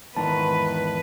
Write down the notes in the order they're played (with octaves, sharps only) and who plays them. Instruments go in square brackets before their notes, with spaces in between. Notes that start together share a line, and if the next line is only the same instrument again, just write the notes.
[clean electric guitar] E2 G#2 D#3 [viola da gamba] B4 [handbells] A5